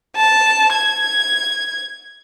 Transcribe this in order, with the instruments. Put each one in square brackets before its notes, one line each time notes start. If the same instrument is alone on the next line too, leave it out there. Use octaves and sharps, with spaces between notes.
[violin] A5
G#6